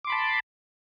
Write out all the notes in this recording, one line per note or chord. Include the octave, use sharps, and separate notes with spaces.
A5 B5 C6 D6